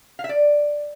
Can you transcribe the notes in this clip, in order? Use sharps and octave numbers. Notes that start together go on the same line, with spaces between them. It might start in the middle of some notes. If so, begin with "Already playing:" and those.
F5
E5
D5